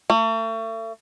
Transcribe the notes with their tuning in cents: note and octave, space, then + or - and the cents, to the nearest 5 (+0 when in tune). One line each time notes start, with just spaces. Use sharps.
A3 +40